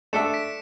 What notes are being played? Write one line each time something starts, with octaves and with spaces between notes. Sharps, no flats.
A3 D4 A4 E5 C#7 E7
B6 D7